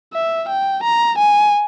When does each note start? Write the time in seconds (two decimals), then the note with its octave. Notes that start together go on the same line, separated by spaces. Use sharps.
0.14 E5
0.49 G5
0.84 A#5
1.18 G#5